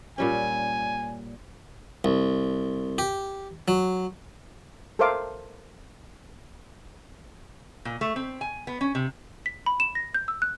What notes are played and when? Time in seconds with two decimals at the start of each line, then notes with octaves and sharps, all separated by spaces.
0.18 A#2 G3 C#4 G#5
2.04 C2
2.98 G4
3.68 F#3
4.99 A4 A#4 C5 E5 F5 D6
7.85 A#2
8.01 A3
8.16 C4
8.41 G#5
8.67 B3
8.81 C#4
8.95 C3
9.46 B6
9.66 B5
9.80 E7
9.95 A#6
10.14 G6
10.28 E6
10.42 F#6